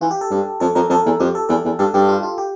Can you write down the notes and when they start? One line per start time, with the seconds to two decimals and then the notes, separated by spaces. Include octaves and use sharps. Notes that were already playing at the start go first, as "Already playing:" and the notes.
0.01 E3 F4
0.11 G4
0.21 A4
0.31 G2
0.60 F2 A4
0.75 F2 A#4
0.90 F2 A4
1.06 E2
1.20 F2 G4
1.35 A4
1.49 E2 A4
1.64 E2
1.79 G2 A4
1.94 G2 G4
2.09 F4
2.23 F4
2.38 G4